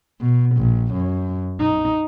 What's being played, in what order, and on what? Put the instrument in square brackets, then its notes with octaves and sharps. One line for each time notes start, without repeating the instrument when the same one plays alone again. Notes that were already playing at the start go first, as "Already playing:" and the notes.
[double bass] B2
A#1
F#2
D#4